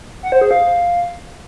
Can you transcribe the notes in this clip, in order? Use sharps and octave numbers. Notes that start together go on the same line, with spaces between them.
F#5
C5
G#4
F5